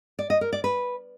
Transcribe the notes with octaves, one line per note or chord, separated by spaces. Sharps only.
D5
D#5
A#4
D5
B4